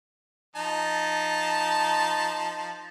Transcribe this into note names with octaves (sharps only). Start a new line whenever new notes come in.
F3 D#4 A5